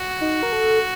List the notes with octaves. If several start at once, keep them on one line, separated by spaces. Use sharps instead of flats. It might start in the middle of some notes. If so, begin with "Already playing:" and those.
Already playing: F#4
D#4
A#4
A4